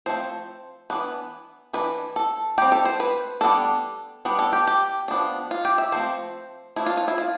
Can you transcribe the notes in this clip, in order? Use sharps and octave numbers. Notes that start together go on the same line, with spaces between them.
F3 A3 C4 C5
E3 G3 B3 D4 B4
E3 A3 D4 B4
A4
G3 C4 G4
A4
C5
B4
G3 B3 D4 A4
G3 B3 D4
A4
G4
G4
F3 B3 D4
F4
G4
E5
F3 A3 C4 C5
F3 A3 D4 E4
F4
F4
E4
F4